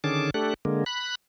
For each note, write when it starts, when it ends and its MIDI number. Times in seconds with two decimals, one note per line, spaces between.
0.04 0.30 50
0.04 0.30 51
0.04 0.30 61
0.04 0.30 68
0.04 0.30 81
0.04 0.30 86
0.34 0.54 57
0.34 0.54 62
0.34 0.54 67
0.34 0.54 69
0.34 0.54 90
0.65 0.84 50
0.65 0.84 56
0.65 0.84 58
0.86 1.15 83
0.86 1.15 90